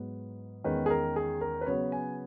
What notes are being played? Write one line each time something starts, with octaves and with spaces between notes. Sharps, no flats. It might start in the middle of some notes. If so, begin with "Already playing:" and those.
Already playing: G#2 F#3 B3
E2 D#3 G#3 C#4 B4
G#4
A#4
G#4
A#4
B4
C#3 F#3 B3 C#5
G#5